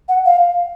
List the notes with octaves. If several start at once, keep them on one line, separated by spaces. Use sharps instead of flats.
F#5
F5